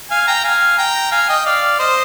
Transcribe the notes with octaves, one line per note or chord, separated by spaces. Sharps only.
F5 G#5
G5 A#5
F5 G#5
G5 A#5
F5 G#5
D#5 G5
D5 F5
C5 D#5